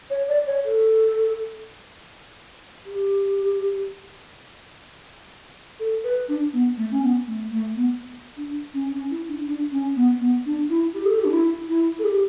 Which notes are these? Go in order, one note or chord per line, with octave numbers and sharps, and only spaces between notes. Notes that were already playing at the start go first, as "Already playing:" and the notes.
C#5
D5
C#5
A4
G4
A4
B4
D4
B3
A3
C#4
B3
A3
A3
B3
D4
C#4
C#4
E4
D4
D4
C#4
B3
B3
D4
E4
G4
A4
G4
D4
E4
E4
A4
G4